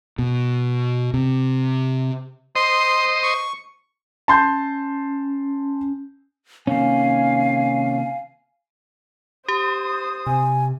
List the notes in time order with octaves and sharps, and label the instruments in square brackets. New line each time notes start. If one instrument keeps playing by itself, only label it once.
[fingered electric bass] B2
C3
[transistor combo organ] C5 D#5 [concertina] C6
[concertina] C#6
[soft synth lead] C#4 [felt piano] A5 C6 G6
[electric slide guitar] C3 D#3 A#3 [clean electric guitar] C#4 [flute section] F5 G#5
[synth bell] G4 [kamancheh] C5 D#6
[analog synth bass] C3 [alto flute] G#5